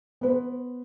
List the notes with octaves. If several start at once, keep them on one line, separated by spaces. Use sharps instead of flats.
B3 B4 C5